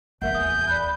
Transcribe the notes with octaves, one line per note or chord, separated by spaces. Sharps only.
D1 E2 A#4 E5 F#5 G6
G#5 D#6
D5 B5 F#6